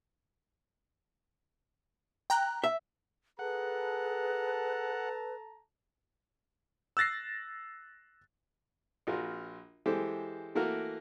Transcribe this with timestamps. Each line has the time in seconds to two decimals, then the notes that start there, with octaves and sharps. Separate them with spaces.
2.30 G5 A#5 F#6
2.64 E5
3.39 G#4 A4 B4 F#5 A5 A#5
6.97 E6 F#6 A6 A#6 C7
9.07 A#1 F4 F#4 A#4
9.86 E3 G#3 G4 A4 C5
10.55 E3 A3 A#3 F#4 A#4